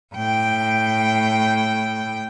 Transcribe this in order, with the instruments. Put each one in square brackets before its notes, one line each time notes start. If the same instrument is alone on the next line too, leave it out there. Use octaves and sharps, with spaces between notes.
[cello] A2 G5